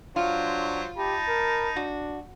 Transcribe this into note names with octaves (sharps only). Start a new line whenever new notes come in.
F#3 D4 F4 C5
D#4 G4 A5 B5
A#4
D4 F#4